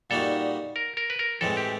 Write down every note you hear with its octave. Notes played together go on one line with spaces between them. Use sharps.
A#2 G3 A#3 D#4 F#4 A4
A#4
A#4
B4
A#4
A2 E3 G#3 C4 A4
G4